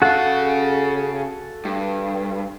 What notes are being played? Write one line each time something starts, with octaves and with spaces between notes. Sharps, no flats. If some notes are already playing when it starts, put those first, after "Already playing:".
C#3 F#4 A4 F5 F#5
G2